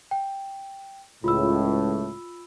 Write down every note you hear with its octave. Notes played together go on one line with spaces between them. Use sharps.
G5
C#2 A2 F4 B5 E6